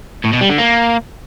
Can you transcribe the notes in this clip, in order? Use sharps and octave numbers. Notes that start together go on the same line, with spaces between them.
A2
B2
G3
D3
A#3